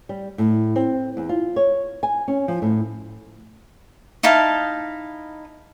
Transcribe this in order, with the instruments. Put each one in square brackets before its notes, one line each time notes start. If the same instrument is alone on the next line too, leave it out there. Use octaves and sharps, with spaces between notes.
[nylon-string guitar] G3
A2
C4
E2
F4
C#5
G#5
C#4
F3
A2
[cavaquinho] D#4 E4 F5 A5